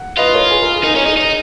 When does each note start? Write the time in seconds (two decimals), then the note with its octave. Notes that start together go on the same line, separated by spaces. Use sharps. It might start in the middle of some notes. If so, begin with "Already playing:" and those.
Already playing: F#5
0.18 F4 B4 D#5
0.35 A#4 C#5
0.51 G#4 B4
0.63 A#4
0.73 G#4
0.84 D#4 A#4
0.95 C#4 A#4
1.06 D#4 G#4
1.17 D#4